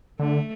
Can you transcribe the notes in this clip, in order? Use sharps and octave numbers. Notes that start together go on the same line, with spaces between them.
D3 A3